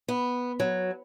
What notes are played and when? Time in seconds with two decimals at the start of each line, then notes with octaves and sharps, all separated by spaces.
0.08 B3
0.60 F#3